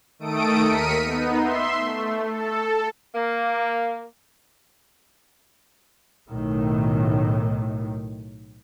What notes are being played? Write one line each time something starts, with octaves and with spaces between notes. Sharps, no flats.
D#3 A3 A4 D#6 D7
D#2 A#4 B6 C#7 D#7
B3 D#4
E5 C6
A3
A4
A#3
B1 A2 D#3